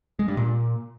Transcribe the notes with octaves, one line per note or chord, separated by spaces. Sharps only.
G#3
G2
A#2